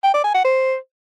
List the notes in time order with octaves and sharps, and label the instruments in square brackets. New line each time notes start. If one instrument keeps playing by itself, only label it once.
[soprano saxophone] G5
D5
G#5
F#5
C5